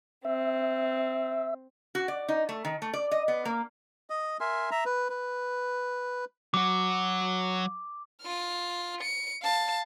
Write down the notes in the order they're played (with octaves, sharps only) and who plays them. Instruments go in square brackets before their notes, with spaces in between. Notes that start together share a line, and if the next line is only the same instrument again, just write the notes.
[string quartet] C4 [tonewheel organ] E5
[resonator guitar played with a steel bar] F#4
D5
D#4
A3
D#3
A3
D5
D#5
B3
A#3
[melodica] D#5
A#4 E5 G#5 C6
E5 A#5
B4
B4
[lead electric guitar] F#3 F#4 [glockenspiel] D6
[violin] F4 F6
C#7 D7
F5 A5